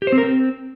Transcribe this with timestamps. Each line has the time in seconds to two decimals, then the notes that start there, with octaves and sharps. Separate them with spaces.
0.02 G4
0.07 C5
0.12 C4
0.18 A#4
0.23 C4